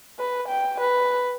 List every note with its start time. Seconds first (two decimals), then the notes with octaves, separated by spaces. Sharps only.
0.19 B4
0.48 G5
0.80 B4